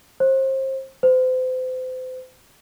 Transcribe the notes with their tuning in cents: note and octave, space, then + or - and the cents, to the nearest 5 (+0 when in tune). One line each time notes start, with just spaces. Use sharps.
C5 +30
C5 -35